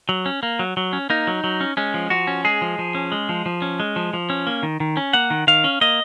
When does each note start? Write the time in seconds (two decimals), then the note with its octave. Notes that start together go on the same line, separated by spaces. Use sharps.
0.09 F#3
0.26 C#4
0.43 A#3
0.59 F#3
0.77 F#3
0.93 C#4
1.10 A#3 D#4
1.27 F#3
1.44 F#3
1.61 C#4
1.77 G#3 C#4
1.94 F3
2.10 F3 F#4
2.27 C#4
2.45 G#3 G#4
2.62 F3
2.79 F3
2.95 C#4
3.12 G#3
3.29 F3
3.46 F3
3.62 C#4
3.80 G#3
3.96 F3
4.13 F3
4.30 C#4
4.47 A#3
4.63 D#3
4.80 D#3
4.97 C#4
5.13 A#3 F#5
5.30 D#3
5.47 D#3 F5
5.64 C#4
5.81 A#3 D#5